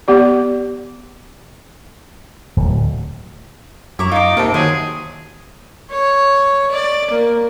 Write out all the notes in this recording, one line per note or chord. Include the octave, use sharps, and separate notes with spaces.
B3 G4 D5
D1
F#2 E4 A#5 C#6 D6
D#4 F4 A#5 D6
C3 A#3 D#4 A5
D#3 F#3 G#4 C5
C#5
D5
A#3